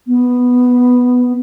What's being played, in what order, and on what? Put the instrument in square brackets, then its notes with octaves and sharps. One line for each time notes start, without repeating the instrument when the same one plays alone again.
[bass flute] B3